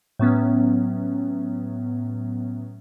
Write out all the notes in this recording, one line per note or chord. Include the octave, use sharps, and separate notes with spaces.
A2 F#3 B3 C#4